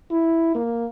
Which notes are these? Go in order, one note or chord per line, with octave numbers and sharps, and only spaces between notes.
E4
A#3